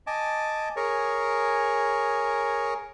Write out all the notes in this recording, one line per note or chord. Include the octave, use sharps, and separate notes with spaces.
D#5 G#5 A5 D6
G#4 A#4 C#5